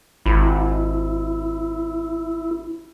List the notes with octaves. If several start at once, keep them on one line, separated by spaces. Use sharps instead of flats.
G#1 E4